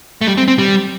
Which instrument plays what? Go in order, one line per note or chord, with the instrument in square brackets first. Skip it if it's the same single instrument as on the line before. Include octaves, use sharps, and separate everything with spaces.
[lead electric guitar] A3
G3
C4
C4
G3